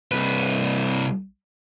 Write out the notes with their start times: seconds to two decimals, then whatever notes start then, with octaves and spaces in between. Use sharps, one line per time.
0.12 C2 B4